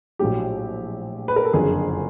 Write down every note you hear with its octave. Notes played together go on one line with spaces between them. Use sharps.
A#1 A2 F#3 G4
B4
A#4
A4
F#1 F2 D3 G#4